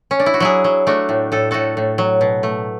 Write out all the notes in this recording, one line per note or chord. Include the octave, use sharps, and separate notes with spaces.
C#4
D4
E4
F#4
F#3 E4 G#4
F#3
A3 D4 F#4
A2
A2 A4
A2 F#4 A4
A2
F#3
B2
A3